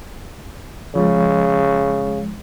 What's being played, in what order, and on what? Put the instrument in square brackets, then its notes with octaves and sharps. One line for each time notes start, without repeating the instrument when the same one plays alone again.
[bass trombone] C#3 [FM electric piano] F3 G#3